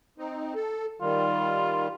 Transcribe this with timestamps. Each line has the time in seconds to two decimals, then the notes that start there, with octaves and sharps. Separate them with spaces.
0.18 C4 D#4
0.55 A4
1.01 D#3 G3 F4